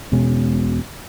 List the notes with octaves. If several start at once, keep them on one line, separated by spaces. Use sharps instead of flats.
E1 B2 G#3 C#4